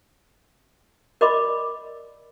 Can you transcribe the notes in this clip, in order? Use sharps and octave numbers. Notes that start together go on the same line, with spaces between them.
A#4 D5 D#5 B5 C6 D6